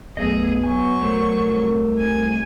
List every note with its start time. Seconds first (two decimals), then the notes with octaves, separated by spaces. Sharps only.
0.17 B1 F#2 A3 B3 G#4 D#5
0.64 F#3 G#5 C#6
1.01 B1 A3 A#4 C5
1.46 C2
1.99 G#5